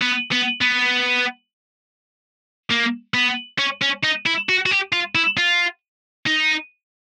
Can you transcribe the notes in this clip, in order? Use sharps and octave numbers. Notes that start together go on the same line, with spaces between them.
B3
B3
B3
A#3
B3
C#4
C#4
D#4
E4
F#4
F#4
G4
F4
E4
F4
D#4